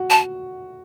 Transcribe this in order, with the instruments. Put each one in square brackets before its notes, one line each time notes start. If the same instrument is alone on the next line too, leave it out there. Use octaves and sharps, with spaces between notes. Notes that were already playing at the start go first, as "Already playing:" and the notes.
Already playing: [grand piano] F#4
[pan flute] A5